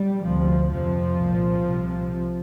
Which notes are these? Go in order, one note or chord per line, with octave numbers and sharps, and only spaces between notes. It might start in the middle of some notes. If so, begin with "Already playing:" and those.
Already playing: G3
D2 C3 F3
F2 C3 F3
C2 A#2
C2 C3